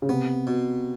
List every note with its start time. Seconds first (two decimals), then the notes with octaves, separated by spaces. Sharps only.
0.02 C#3
0.09 C3 B3
0.47 B2